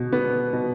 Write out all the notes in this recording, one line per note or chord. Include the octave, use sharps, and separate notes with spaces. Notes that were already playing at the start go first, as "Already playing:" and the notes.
Already playing: B2
B3
B2